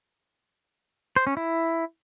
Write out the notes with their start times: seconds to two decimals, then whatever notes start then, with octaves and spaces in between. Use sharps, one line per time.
1.16 C5
1.27 C#4
1.37 E4